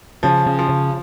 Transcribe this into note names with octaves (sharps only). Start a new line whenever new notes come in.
C#3 F3
C#3
F3
C#3